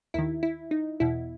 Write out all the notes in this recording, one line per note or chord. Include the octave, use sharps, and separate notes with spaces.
D#2 D#3 E4
E4
D#4
E2 B2 E4